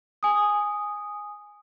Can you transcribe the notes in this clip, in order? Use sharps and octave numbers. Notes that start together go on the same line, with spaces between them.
G#5 D#6